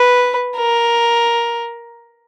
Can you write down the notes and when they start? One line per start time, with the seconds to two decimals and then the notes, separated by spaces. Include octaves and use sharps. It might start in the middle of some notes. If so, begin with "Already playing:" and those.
Already playing: B4
0.57 A#4